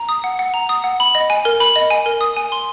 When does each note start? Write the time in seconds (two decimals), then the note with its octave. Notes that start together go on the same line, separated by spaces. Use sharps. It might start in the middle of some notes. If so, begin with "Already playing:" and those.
Already playing: A#5
0.09 D#6
0.24 F#5
0.39 F#5
0.54 A#5
0.69 D#6
0.84 F#5
1.00 B5
1.15 D#5
1.30 G#5
1.45 A#4
1.60 B5
1.76 D#5
1.91 G#5
2.06 A#4
2.21 D#6
2.37 G#5
2.52 C6